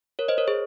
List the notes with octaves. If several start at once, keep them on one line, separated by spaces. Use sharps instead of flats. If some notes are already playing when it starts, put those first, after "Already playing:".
A#4 C#5
C5 D#5
A#4 C#5
G#4 C5